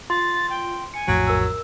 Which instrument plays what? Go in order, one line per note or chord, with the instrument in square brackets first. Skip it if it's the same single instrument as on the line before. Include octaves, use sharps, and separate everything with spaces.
[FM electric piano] F4 [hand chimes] C6 [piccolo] A6
[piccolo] G5
[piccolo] G#5 [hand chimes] C#7
[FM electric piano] A#1 F2 A2 [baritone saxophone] F#3
[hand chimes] A#4 E6